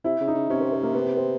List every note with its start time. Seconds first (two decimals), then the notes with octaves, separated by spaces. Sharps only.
0.04 C3 E4
0.20 C#3
0.28 D#4
0.34 C#3
0.50 C3 C#4
0.61 C4
0.72 C4
0.83 A#3
0.94 B3
1.05 B3
1.17 C4